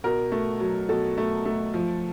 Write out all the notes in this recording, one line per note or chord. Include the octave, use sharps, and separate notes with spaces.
B2 A#4
A3
F#3
B2 A4
A3
A3
F3